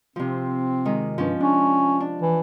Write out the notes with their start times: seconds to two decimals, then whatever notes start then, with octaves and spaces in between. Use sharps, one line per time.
0.16 C3 F3 C4
0.85 D#3 G#3
1.18 G2 F3 C#4
1.40 C#4 D4
2.00 D4
2.22 E3